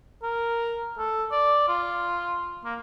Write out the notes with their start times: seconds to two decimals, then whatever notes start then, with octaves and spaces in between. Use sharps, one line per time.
0.23 A#4
0.99 A4
1.31 D5
1.68 F4
2.64 A#3